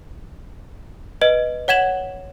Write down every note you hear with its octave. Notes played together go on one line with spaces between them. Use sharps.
B4 D#5 D7
C#5 F#5 G#6 E7 F#7